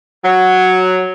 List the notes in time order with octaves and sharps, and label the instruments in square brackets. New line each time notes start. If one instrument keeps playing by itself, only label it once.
[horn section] F#3